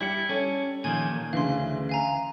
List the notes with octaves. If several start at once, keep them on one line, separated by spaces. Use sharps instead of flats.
G3 E4 G4 C#7
G3 C#4 A4
A#2 D#3 F3 G#5 G#6
D2 C#3 E3 F5 C6
F5 G#5 A#5